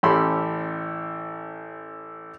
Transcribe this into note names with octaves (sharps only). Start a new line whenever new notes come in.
A1 C#4 G4 A4 B5 C6